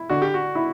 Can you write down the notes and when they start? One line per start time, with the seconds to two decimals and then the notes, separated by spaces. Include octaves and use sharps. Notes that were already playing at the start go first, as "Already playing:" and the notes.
Already playing: E4
0.09 D3 F#4
0.22 G4
0.34 F#4
0.55 E4